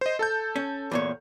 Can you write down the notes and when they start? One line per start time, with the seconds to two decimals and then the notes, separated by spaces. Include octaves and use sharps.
0.01 C5 D#5
0.19 A4 A5 G6
0.56 C#4
0.91 E2 A#2 C#5